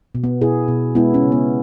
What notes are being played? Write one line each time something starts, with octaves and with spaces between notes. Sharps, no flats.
B2
B3
B2 E4 G#4
B2
G#3 B3 E4
C#4
C#3
B3